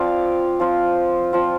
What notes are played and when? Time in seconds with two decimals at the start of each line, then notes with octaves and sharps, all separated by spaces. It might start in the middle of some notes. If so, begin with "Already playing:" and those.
Already playing: F3 C4 F4 D5 F5
0.60 F3 C4 F4
1.33 F3 C4 F4